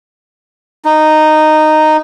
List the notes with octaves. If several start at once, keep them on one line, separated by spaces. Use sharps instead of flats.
D#4